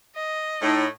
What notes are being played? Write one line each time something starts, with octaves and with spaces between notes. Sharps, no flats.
D#5
A2 D#4